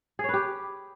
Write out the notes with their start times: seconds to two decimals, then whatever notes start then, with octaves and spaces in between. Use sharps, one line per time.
0.19 G#4
0.24 C#5
0.29 B4
0.34 G4